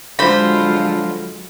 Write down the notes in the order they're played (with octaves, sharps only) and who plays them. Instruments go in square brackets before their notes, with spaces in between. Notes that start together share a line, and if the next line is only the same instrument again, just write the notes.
[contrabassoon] D3 [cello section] F#3 G#3 [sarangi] F4 [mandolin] C5 B5